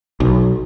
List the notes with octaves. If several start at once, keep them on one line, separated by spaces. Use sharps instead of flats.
B1